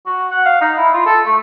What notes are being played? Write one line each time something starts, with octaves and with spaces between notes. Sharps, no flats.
F#4
F#5
F5
D#4
E4
F4
A4
A3